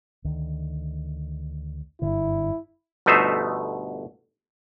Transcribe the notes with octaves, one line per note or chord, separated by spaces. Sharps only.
D2 D#3
F#1 G2 D3 E4
G1 B2 A3 D#4 C5 E5